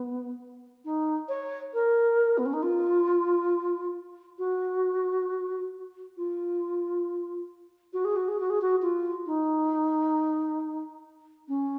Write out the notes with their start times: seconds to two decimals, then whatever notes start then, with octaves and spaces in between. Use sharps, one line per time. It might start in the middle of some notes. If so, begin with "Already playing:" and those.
Already playing: B3
0.85 D#4
1.29 C#5
1.74 A#4
2.38 B3
2.46 C#4
2.53 D#4
2.63 F4
4.39 F#4
6.17 F4
7.93 F#4
8.05 G#4
8.16 F#4
8.28 G#4
8.40 F#4
8.50 G#4
8.61 F#4
8.82 F4
9.26 D#4
11.48 C#4